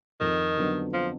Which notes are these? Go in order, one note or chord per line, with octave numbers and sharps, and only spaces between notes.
F2 D#3
D3 F#3 B3
F3